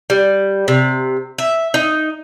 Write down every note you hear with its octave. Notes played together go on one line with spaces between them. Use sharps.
G3
C3
E5
D#4